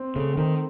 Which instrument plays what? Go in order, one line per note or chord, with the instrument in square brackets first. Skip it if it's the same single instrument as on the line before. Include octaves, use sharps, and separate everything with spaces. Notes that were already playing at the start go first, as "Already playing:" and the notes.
Already playing: [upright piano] C4
[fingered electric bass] C#3 [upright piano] A3
[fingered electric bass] D#3 [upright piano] C4